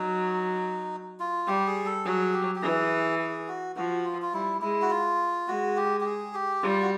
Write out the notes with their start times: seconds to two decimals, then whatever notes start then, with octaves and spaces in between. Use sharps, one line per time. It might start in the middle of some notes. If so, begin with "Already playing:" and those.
Already playing: F#3 D#4
1.20 F4
1.47 G3 G4
1.67 G#4
1.86 A4
2.05 F#3 G#4
2.33 G4
2.55 G4
2.62 E3 G#4
3.19 G#4
3.48 F#4
3.76 F3 F#4
4.05 F4
4.22 F4
4.34 G3 E4
4.62 G#3 E4
4.82 F#4
4.90 F4
5.48 G#3 F#4
5.77 G4
6.00 G4
6.06 G#4
6.34 G4
6.62 G3 F4
6.82 F#4